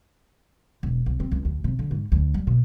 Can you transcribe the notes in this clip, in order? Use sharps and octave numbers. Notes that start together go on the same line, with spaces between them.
E1
C2
C4
C#2
D2
C3
D3
G#2
D2
G3
B2